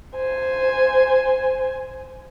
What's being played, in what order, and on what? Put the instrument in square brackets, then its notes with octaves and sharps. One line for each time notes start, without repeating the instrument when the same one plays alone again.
[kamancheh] C5 G#5